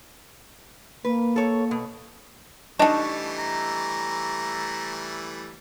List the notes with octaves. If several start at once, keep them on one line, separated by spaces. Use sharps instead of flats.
A#3 B4
A4 C#5
B2
E3 G3 A3 D4 D#4 D#5 A5 C#6
A#5